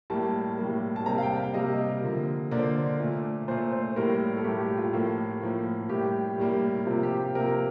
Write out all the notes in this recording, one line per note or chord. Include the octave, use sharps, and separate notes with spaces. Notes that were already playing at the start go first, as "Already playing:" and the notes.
A2 G3 A#3 A5
A2 G3 A#3
A5
C3 G3 A#3 A#5
F5
G5
F5
C3 G3 A#3 D#5
D3 F3 A#3
D3 F3 A#3 D5
C5
D5
A#2 A3
A#2 A3 C5
C5
A2 G3 A#3 A#4
A4
A2 G3 A#3 G4
G4
F4
A2 F3 A#3 A4
A2 F3 A#3
A2 G3 A#3 G4
A2 G3 A#3
C3 F3 A#3 F4
G4
C3 F3 A#3 A#4
A#4